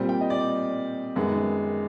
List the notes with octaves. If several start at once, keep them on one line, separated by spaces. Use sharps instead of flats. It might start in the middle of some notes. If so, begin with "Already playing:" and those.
Already playing: A#2 G3 C4
G5
D#5
D5
F#2 D#3 G#3 B3